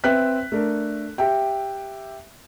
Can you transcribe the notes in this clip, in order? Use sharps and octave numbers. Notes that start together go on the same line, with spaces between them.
C4 B4 E5 G5 F#6 B6
A3 D4 A#4
G4 E5 G5